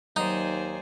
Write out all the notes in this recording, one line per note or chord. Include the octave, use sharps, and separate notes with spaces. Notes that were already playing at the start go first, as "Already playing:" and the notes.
D#2 F#3 D#4 C5 D5 G#5